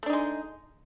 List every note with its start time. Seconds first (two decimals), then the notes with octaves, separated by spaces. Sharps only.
0.03 A3
0.06 D4
0.10 D#4
0.13 G#3